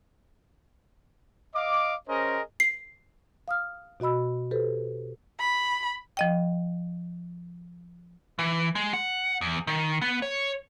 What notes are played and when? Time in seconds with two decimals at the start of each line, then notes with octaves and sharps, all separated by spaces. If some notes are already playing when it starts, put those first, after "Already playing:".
1.55 D#5 F5 D6
2.09 C#4 G#4 A#4 C5 D#5
2.60 C7
3.48 F5 D#6 F6
4.00 B2 F#4 D#5 B5 E6
4.51 G4 A4 B4 C5
5.40 B5
6.17 F3 D#5 G5
8.39 E3
8.75 G#3
8.93 F#5
9.41 E2
9.67 D#3
10.02 B3
10.22 C#5